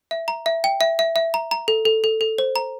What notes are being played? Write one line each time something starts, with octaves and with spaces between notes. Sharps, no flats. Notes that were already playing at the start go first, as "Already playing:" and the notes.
E5
A#5
E5
G5
E5
E5
E5
A#5
A#5
A4
A4
A4
A4
C5
A#5